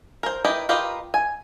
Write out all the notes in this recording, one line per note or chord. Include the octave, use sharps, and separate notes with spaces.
A#4 C5
E4 G4 A#4 B4 D#5
F4 G4 A#4 B4 D#5
G#5